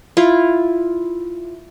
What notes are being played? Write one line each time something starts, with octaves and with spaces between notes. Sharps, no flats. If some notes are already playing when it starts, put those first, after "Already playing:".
E4 F4